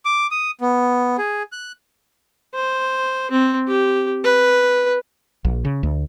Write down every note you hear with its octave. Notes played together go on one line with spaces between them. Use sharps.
D6
D#6
B3
G#4
F#6
C5
C4
G4
B4
A#1
C#3
D2